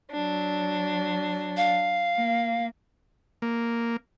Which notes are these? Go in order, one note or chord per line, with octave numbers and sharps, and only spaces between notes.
F#3 D4
F5
A#3
A#3